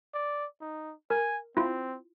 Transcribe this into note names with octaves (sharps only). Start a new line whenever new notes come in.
D5
D#4
A#4 G#5
C4 E4 F4